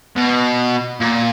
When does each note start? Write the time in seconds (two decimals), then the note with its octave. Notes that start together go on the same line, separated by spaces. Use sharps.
0.16 B2
1.00 A#2